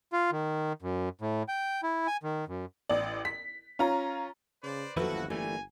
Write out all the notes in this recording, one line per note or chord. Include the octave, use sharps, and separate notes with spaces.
F4
D#3
F#2
A2
G5
E4
G#5
D#3
F#2
A1 D5
B6
C#4 F4 A#5
C#3 B4 C5 D5
G1 D#2 F3 F#3 E4 F#4 A4 B4
E3 G3 A3 A#3 G#5